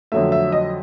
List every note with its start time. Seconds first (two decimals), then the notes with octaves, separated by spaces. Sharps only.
0.12 F2 D3 F#3 A3 E5
0.32 E5
0.52 D#5